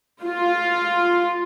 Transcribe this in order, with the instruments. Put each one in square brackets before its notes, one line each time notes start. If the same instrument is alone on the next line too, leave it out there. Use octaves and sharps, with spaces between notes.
[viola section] F4